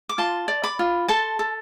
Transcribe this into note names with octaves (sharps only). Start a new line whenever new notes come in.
D6
F4 A5 C6
D5
B5 D6
F4
A4 A5 C6
A4